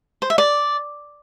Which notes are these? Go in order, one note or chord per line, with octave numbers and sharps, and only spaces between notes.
C5
E5
D5